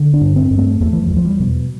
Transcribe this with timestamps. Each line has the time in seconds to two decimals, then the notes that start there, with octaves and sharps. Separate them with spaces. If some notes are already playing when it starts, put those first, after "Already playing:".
Already playing: D3
0.14 D4
0.21 G2
0.36 C4
0.51 G2
0.58 A3
0.80 E2 A3
0.93 E3
1.02 F3
1.10 E2
1.17 F3
1.25 G3
1.40 B2